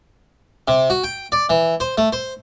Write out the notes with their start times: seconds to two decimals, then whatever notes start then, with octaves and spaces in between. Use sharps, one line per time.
0.68 C3
0.90 F#4
1.04 G5
1.32 D5
1.50 E3
1.80 C5
1.98 A3
2.13 C5